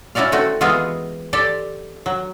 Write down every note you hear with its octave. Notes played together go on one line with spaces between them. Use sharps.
C#4 E4 F#4 D5 F5
A3 C4 F#4
E3 G#3 B3 F4 F#4 G#4
G4 A4 C5 D5
F#3